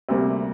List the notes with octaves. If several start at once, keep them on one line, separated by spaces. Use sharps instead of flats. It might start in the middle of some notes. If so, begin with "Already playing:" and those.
D2 C3 G3 A#3